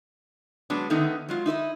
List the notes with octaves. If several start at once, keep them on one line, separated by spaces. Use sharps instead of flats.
F#3 G#3 B3 D4
D3 D#3 A3 B3 D#4
F#3 G#3 F4
D#4 E4 B4 D#5